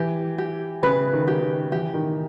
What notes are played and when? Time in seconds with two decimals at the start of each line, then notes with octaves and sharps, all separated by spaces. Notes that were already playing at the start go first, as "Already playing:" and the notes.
Already playing: E3 G4
0.38 G4
0.83 C#3 B4
1.13 D#3
1.28 G4
1.42 D#3
1.72 E3 G4
1.94 D#3